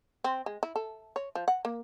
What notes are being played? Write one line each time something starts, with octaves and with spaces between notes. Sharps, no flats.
C4
G#3
E4
A4
C#5
F3
F#5
A#3